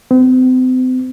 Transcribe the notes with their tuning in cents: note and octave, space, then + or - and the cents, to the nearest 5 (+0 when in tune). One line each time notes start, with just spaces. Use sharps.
C4 -40